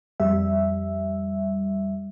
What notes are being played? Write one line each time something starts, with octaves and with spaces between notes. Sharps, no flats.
F2 G3 E5